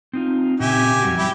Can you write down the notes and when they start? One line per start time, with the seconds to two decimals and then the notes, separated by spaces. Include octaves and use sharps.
0.13 C4 D#4 F4
0.60 A#2 C#3 C4 G4 E5 G#5
1.03 F2 G3 F#4
1.18 F#3 E4 G4